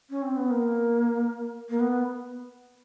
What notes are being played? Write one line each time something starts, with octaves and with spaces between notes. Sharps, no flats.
C#4
C4
B3
A#3
A#3
B3